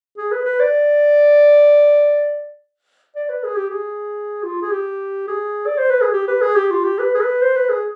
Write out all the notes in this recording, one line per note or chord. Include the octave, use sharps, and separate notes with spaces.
G#4
B4
B4
D5
D5
B4
G#4
G4
G#4
F4
G#4
G4
G#4
D5
C5
B4
G#4
G4
B4
G#4
G4
F4
G4
B4
G#4
B4
C5
B4
G#4